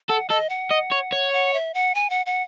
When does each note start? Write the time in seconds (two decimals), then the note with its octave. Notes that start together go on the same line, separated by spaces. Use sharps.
0.09 A4 F#5
0.29 A4 D#5
0.49 F#5
0.70 D#5
0.92 C#5
1.12 C#5
1.33 F#5
1.54 E5
1.74 F#5
1.95 G#5
2.10 F#5
2.26 F#5